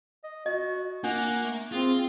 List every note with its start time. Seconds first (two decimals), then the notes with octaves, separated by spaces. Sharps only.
0.24 D#5
0.46 F#4 D#5
1.04 A#3 D4 F#5
1.44 A3
1.72 C4 F4 G#4